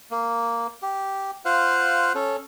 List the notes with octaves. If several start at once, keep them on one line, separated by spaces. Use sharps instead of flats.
A#3
G4
F4 C5 F5 F#5
C#4 A4